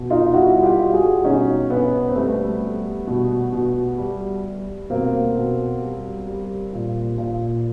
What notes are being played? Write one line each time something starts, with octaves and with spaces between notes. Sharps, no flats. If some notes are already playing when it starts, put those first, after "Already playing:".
Already playing: B2
D#4 F4
G3 E4 F#4
F4 G4
G3
F#4 G#4
B2 C#4 D#4
B2 B3 C#4
C4
G3 A3 B3
G3
B2
B2
G3
G3
B2 A#3 C4
B2
G3
G3
A#2
A#2